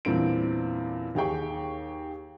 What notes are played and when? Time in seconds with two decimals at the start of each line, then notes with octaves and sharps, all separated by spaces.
0.05 E2 A#2 G3 C4 D4 D7
1.15 D#2 G4 G#4 G5 C#6